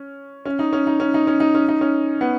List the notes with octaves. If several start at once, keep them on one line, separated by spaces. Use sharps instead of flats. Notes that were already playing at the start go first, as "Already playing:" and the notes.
Already playing: C#4
C#4
D#4
C#4
D#4
C#4
D#4
C#4
D#4
C#4
D#4
C#4
B3